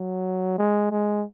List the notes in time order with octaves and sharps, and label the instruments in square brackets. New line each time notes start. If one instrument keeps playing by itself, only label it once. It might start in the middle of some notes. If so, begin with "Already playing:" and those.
Already playing: [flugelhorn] F#3
G#3
G#3